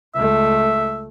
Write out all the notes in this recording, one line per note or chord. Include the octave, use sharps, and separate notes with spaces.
C#2 A3 E5